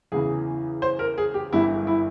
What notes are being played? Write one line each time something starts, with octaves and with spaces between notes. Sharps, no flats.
E2 C#3 E3 G#4
C5
A#4
G#4
G4
G1 G2 E3 E4
E4